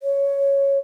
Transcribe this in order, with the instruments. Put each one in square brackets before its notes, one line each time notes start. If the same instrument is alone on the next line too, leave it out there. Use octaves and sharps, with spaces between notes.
[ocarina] C#5